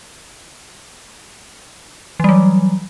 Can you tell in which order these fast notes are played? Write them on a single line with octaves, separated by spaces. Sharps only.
E3 G3 F#3